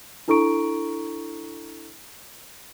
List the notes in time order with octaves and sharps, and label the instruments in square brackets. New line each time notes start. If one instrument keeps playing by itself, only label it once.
[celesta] D4 E4 A4 A#5 C#6 D7